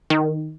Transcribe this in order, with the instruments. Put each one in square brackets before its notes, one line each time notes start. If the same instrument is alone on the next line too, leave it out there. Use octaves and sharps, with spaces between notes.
[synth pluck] D#3